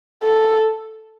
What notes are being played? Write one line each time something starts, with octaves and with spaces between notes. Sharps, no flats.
A4